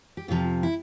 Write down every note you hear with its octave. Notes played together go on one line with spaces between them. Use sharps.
G4
F2 C3 F3 F4
E4